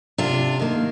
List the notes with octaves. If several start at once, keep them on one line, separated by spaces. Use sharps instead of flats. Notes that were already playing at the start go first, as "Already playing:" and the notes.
C3 D4 F4
D#3 A#3